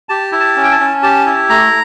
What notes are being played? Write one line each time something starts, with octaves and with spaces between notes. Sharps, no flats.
G4 A5
E4
A5
C#4
G5
A5
C#4
G4 A5
E4
A3 A#5